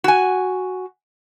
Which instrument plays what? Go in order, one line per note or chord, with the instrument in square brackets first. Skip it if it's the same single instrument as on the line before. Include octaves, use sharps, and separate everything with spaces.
[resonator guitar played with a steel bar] F#4 G#5